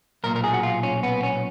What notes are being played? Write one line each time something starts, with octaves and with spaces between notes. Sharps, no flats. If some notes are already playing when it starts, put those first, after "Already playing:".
B1 A#2 A#4
A#4
G#4
F#4
F4
C#4
B3
C#4